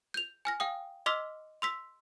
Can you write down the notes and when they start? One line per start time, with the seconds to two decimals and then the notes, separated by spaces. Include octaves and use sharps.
0.14 G6 F7
0.45 G#5 F6 A#6
0.60 F5 G5 D#6
1.06 D#5 C6 D6 E6 F6 B6
1.62 C6 E6 B6